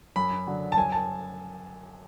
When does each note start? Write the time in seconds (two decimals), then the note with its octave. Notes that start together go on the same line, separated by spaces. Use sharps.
0.16 F#2 B5
0.47 D3 F#3
0.72 A5
0.77 F#2 G#5
0.92 A5